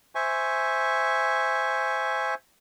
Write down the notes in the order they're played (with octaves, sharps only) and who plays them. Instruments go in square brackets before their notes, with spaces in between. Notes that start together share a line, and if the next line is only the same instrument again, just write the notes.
[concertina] C5 E5 G#5 C#6